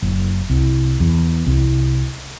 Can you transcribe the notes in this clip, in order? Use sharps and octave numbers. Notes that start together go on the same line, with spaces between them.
F#1
C2
E2
C2